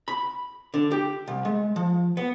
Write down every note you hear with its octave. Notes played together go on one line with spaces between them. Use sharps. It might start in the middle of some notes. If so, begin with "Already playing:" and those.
B5
D3
G4
C2
G#3
F3
B3